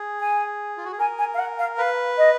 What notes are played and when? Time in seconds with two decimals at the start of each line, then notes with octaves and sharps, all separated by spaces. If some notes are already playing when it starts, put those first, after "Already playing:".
Already playing: G#4
0.19 G#5
0.77 F4
0.85 F#4
0.92 G#4
0.99 A#4 G#5
1.18 G#5
1.34 F5
1.38 F#5
1.58 F5
1.78 B4 F5
2.17 D#5